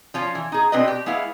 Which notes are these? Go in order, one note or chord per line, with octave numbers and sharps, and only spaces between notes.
F3 C#4 F4
E3
D#4 G#4
B2 C4 D4 B4 D#5
G4
G#3 B3 E4 F5